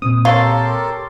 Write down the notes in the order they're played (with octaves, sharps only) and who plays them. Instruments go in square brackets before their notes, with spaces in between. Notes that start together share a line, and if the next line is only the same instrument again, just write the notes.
[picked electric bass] A#2 C4 [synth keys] D#6
[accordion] G4 A4 A#4 [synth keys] C#5 C6 A6 [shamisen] F5